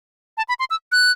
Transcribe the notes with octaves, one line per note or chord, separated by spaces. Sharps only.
A5
B5
C6
E6
F#6